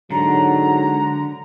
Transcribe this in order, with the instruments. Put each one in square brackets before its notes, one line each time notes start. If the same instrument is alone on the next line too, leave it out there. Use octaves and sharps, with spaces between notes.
[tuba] G#2 [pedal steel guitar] D3 [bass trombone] F#3 [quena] A#5